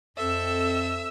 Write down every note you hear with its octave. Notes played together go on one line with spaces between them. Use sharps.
F2 C4 A4 E5 E6